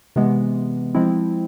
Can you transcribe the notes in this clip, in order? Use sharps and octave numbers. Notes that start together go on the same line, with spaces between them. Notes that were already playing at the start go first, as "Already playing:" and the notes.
C3 E3 G#3 B3
F3 G#3 C4 E4